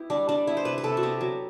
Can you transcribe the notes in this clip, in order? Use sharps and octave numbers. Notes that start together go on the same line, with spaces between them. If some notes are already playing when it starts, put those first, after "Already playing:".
Already playing: B3 E4 G4
G3 D4
G3 D4
B3 E4
C5
C3 B4
B4
C3 A4
F#4
B3 G4
F#3